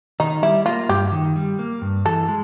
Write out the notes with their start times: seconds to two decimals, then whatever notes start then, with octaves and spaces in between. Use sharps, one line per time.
0.20 D#3 D#4
0.42 G3 E4
0.66 A#3 F4
0.89 G2 G4
1.12 D#3
1.36 G3
1.59 A#3
1.82 G2
2.05 E3 A4
2.28 G#3